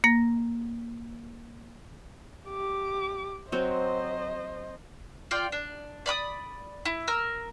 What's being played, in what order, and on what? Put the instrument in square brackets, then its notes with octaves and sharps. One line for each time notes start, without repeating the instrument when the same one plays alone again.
[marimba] A#3 A#6
[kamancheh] G4 D6
[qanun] F#3 C4 [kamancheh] C5 D#5
[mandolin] F4 D5 G5
D4
D5 B5 D6 D#6
E4
A#4 E6